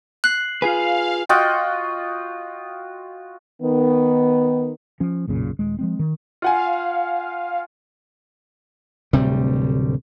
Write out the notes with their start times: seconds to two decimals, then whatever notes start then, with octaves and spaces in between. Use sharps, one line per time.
0.24 F#6 C7 F#7
0.62 F4 G#4 B4 F5 G#5
1.29 F4 F#4 D#5 G5
3.60 D#3 B3
5.00 F3 C#4
5.27 B1 F#2 A#2 C#3
5.59 D#1 G#3
5.79 F3 G#3 C4
5.99 D#3
6.42 F4 F5 F#5 G#5
9.13 D1 D2 C3 G3